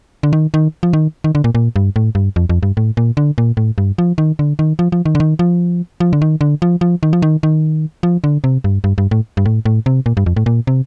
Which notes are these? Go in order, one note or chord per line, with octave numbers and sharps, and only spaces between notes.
D3
D#3
D#3
F3
D#3
D#3
D3
A#2
A#2
G2
A2
G2
F2
F2
G2
A2
A#2
D3
A#2
A2
G2
F3
D#3
D3
D#3
F3
F3
D#3
D3
D#3
F3
F3
D3
D#3
D3
F3
F3
D#3
F3
D#3
D#3
F3
D3
C3
G2
G2
G2
A2
G2
A2
A2
C3
A#2
G2
F2
A2
A#2
C3